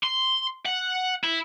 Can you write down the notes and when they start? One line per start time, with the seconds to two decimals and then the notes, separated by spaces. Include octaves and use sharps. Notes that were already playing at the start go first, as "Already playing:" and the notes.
0.03 C6
0.66 F#5
1.23 E4